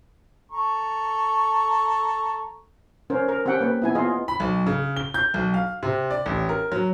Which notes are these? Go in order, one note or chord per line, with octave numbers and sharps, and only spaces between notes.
A4 A#5 C#6
C#4 A#4 C5
A#4
C4 C#4 G4 F#5 G5
A#3 B4
B3 E4 G#5
B3 F4 G#4 D#5 F5
B5
B1
C#3
G7
G6
B1
F5
C3
D5
A1
A#4
F#3